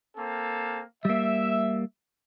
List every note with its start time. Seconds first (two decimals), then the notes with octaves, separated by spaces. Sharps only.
0.17 A#3 C4 A4
1.05 G3 A#3 E5